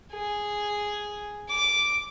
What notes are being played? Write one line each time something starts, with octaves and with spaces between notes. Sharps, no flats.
G#4
D6